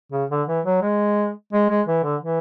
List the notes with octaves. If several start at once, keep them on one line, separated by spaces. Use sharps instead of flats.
C#3
D3
E3
F#3
G#3
G#3
G#3
E3
D3
E3